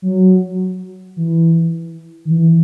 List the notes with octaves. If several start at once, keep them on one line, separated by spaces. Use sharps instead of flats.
F#3
E3
D#3
E3